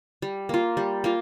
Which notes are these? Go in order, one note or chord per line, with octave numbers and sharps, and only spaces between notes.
G3
A#3 F4
G3
A#3 F4